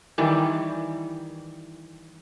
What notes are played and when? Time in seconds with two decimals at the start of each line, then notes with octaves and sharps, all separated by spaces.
0.18 D#3 E3 G3